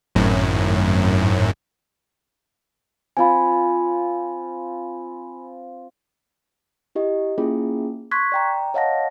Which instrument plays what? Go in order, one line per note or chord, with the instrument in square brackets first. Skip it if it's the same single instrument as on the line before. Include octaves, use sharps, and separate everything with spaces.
[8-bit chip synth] G#1 F#2 A2
[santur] C4 F4 [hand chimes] G#5 B5
[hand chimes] E4 G4 D#5
A#3 C#4 E4 F4 G#4
C6 C#6 F#6 G#6 B6
D5 G5 A#5
C#5 D#5 F5 F#5 A5 A#6